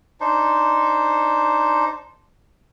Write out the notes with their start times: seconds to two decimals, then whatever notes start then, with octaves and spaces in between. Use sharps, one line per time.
0.20 D4 D#4 C5